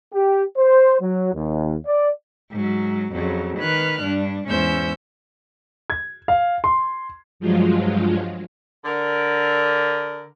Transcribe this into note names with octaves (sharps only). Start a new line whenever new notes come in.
G4
C5
F#3
D#2
D5
G#2 F#3
F2 C#3 F#3
D#3 B4 F6 F#6
G2 D4
E2 G#2 C#4 C5 E6 G6
G#6
F5
C6
G2 F3 F#3 G#3 F4
D3 A#4